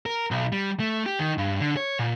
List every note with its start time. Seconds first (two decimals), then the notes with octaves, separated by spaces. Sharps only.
0.06 A#4
0.31 B1
0.52 G3
0.80 A3
1.06 G4
1.19 D#3
1.38 G2
1.60 D3
1.77 C#5
1.99 A#2